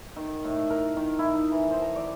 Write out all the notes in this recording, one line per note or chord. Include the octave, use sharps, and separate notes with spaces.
D#3
A2
A#4
D#3
E4
D#4
E3
C5
A#5
D5